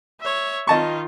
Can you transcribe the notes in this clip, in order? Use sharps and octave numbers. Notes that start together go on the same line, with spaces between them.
C#5 E5
D#3 F4 D#5 A5 C#6